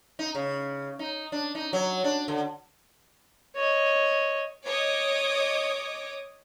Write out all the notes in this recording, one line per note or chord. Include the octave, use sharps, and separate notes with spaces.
D#4
C#3
D#4
D4
D#4
F#3
D4
D3
C#5 D#5
C#5 D#5 D6 D#6